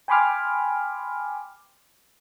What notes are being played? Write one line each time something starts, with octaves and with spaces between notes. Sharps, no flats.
G5 G#5 B5 C6 D6 F6